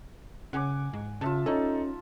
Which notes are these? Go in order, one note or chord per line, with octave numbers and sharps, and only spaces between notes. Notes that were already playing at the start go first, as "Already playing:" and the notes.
C#3 F#5 G#5 D6
G#2
C#3 F4 E5 A5
C#4 D#4 A4